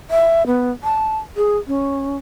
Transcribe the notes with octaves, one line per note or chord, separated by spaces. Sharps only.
E5
B3
A5
G#4
C#4